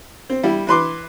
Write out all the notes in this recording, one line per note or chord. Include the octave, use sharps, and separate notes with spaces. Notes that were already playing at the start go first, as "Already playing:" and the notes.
C4
G3 E4
E3 B4 C6 D6